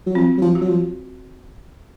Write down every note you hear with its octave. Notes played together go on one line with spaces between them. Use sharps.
F#3
F3 C4
F#3
F3
F#4
F#3
F3